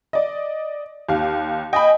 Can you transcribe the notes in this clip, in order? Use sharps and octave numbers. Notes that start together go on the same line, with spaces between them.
D5 D#5
D#2 F5
D#5 G5 G#5 B5